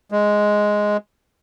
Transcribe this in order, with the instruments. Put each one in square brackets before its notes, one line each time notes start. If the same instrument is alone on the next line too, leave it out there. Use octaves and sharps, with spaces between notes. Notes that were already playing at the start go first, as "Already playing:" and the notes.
[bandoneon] G#3